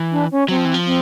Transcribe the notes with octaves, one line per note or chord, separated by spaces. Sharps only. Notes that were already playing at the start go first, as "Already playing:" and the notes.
Already playing: E3
D4
C#4
F#3 C4
F3
E3
F3
C4